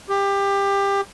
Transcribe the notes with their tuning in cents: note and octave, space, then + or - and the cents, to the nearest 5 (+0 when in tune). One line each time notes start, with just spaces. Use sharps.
G4 +20